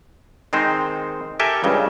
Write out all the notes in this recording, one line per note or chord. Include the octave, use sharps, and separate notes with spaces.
D#3 G#3 C4 D#4 C5
G4 A4 A#4 E5 G5 G#5
C#2 G2 C#3